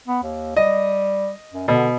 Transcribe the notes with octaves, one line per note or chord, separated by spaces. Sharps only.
B3
D#2
G3 D#5
F#2
B2 D3